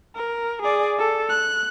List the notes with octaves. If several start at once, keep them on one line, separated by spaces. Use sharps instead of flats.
A#4
G#4 D5
A4
F#6